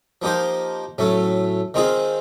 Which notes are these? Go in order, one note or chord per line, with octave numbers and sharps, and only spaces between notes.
F3 A#3 D#4 G4 C5
A2 F#3 A3 C#4
D#3 G#3 C4 F4 G#4